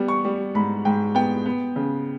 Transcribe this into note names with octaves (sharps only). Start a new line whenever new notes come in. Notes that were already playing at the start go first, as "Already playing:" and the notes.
Already playing: G3 B3
C#6
G3
G#2 B5
G#2 G5
B3 G5
B3
C#3